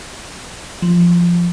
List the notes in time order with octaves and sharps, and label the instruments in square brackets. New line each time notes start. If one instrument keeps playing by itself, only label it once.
[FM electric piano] F3